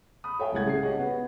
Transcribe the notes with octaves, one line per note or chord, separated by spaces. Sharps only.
B5 D#6
A4 C#5 E5 F5 G5 G#5
C2 G#3 F#5 G#6
C#3 G#4 C7
G4 C#5 D#5 F#5
B3